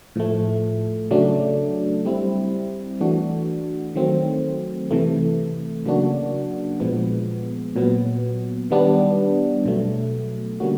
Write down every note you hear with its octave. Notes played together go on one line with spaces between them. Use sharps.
A2 F3 A3
C#3 F#3 A3 D4
G3 C4 E4
E3 A3 D4 F#4
D#3 F#3 A3 C4
C3 E3 A3
C#3 F#3 A#3 D4 F#4
A#2 F3 G#3 B3
A#2 F#3 B3
D#3 G3 B3 D4
B2 F#3 A3
D3 G3 A#3 C#4 F#4